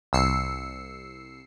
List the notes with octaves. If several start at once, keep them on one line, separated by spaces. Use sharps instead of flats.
C2 E6 C7 C#7